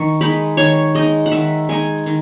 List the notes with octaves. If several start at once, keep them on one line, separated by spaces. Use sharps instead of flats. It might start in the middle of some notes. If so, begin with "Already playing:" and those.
Already playing: D#3 C#6
G#3 D#4 B5
D#3 C#5
G#3 D#4 D#5
F#5
D#3 E5
G#3 D#4 G#5
D#3